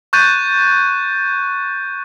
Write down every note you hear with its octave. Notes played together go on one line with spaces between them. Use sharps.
C#6 F#6 G6 A6 D#7